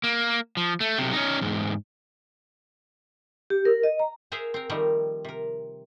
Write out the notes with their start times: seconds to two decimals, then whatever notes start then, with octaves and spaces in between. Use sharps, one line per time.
0.04 A#3
0.57 F3
0.80 A3
0.98 B1 C3
1.13 C#4 D#4
1.41 E2 G#2
3.50 G4
3.65 A#4
3.83 D#5
3.99 A#5
4.32 G#4 A#4 C5 E5 F5
4.54 C4 A#4
4.69 D#3 F3 G3 A3 A#4
5.25 C3 A#4